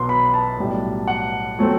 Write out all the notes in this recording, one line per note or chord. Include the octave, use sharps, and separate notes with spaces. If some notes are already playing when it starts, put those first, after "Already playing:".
Already playing: B1 B2 F#3 B3 C6
B5
A5
B1 A2 G3
F#5
F#3 A3 C4